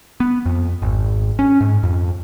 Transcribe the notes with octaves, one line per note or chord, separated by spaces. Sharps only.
B3
F2
G#1
C#4
G#2
F2